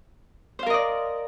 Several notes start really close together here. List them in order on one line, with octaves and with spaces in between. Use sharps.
C5 F5 A#4 D#5 D5